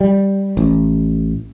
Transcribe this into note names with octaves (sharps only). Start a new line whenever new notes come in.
G3
A1